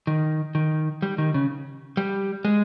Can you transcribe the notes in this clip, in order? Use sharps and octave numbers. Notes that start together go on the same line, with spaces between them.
D#3
D#3
G3
D#3
C#3
G3
G#3